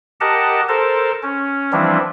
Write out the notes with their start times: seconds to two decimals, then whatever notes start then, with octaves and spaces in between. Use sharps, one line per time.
0.21 G4 A#4 D#5 F#5 A5
0.68 A4 A#4 C5 A5
1.23 C#4
1.72 E3 F3 G3 C4 D4 E4